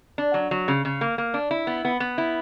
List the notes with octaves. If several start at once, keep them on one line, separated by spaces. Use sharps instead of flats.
D4
F#3
F#3
C#3
C#3
A#3
A#3
D4
E4
B3
B3
B3
E4